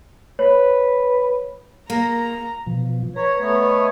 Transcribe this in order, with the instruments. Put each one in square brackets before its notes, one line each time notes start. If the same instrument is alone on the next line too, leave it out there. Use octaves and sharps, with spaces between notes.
[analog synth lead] B4 [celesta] C#5
[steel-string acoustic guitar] A#3 [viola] A#5
[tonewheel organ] B2 F3
[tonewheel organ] B4 A#5 [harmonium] C#5
[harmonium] A3 B3 C#5
[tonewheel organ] D#5